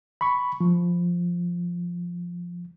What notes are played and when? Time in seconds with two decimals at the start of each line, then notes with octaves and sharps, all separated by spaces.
0.21 B5 C#6
0.61 F3